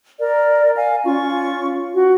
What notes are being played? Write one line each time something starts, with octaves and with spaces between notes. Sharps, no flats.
A#4 D5
F5 G#5
C#4 F4 C#6
F#4